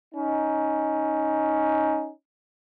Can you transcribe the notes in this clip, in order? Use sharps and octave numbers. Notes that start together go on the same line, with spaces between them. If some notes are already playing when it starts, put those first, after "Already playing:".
C#4 D#4